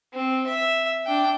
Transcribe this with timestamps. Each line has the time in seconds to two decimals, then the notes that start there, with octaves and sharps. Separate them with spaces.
0.14 C4
0.47 E5
1.06 D4 G5